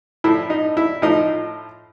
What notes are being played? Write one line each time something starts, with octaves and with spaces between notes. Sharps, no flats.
A2 F3 E4
D#4
E4
A2 F3 D#4